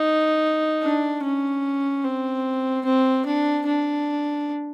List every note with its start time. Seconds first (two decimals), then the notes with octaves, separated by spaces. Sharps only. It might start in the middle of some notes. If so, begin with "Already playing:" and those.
Already playing: D#4
0.83 D4
1.23 C#4
2.04 C4
2.85 C4
3.26 D4
3.67 D4